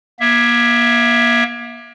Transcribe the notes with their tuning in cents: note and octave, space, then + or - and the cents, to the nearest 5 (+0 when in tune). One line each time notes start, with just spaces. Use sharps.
A#3 +35 E5 +0